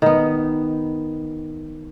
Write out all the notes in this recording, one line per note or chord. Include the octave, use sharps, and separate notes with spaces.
D#3 B3